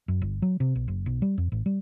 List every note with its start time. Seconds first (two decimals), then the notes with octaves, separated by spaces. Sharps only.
0.08 F#2
0.22 G1
0.42 F#3
0.60 C3
0.76 B1
0.88 F#1
1.06 B1
1.22 G3
1.38 F2
1.52 A1
1.66 G3